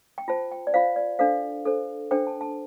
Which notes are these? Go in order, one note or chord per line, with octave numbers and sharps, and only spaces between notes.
G5
F4 C5 A5
G5
D5
F4 C5 F5
D5
D4 A4 C5 F5
D4 A4 C5
D4 A4 C5 G5
A5
A5